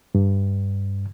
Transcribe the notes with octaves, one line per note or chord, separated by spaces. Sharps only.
G2